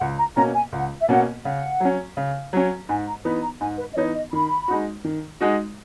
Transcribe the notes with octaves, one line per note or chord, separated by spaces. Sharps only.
C#2 F#5
A#5
B2 A#3 C#4 A#5
G#5
C#2 F#5
E5
B2 A#3 C#4 F#5
C#3 F#5
F#3 C#4
C#3
F#3 C#4
G#2 G#5
A#5
E3 B3 D#4 B5
A#5
G#2 G#5
B4
D#5
E3 B3 D#4 C#5
D#5
D#3 B5
G#3 D#4 F#4
D#3
G#3 D#4 F#4